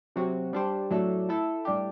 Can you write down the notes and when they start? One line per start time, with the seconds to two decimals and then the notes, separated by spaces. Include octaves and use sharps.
0.16 C3 F#3 C4 F#4
0.53 G3 D4 G4 C5
0.91 A2 F#3 A3 D4 A4
1.29 A3 E4 A4
1.65 A2 G3 D4 G4